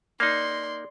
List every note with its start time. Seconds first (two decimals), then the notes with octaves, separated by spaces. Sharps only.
0.20 A#3 D#4 D5 C6